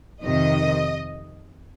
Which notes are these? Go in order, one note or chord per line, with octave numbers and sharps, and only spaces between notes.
F2 C3 D#3 D#5